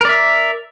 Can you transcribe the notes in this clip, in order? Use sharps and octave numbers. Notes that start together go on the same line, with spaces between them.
A#4 D5 E5